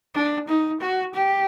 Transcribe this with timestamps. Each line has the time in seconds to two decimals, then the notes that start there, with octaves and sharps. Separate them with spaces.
0.15 D4
0.48 D#4
0.81 F#4
1.14 G4